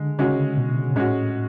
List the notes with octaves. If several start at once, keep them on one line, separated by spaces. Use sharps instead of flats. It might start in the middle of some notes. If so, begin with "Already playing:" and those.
Already playing: D3 G#3
C#3 G#3 C#4 F#4
B2
A2 G#3 C#4 F#4